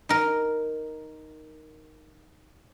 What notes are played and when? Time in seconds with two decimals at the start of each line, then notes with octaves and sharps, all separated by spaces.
0.09 D#4 A#4